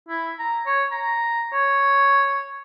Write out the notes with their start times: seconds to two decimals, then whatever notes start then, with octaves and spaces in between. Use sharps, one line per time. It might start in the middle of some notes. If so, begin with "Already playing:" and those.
0.09 E4
0.39 A#5
0.66 C#5
0.92 A#5
1.53 C#5